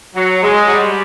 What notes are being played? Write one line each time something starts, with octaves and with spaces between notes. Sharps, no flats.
F#3
G#3
F#3
G3